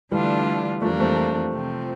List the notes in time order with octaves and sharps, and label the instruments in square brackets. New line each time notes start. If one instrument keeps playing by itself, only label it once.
[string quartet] D3 A3 D4 F4 [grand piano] E3 G3
[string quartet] F2 E3 G3 A#3 D4 [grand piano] F3 A3
[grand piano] A3 C4
[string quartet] C3 F3 C4